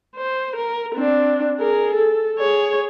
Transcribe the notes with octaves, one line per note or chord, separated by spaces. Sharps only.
C5
A#4
C4 D4
G#4 A#4
A4
G#4 C#5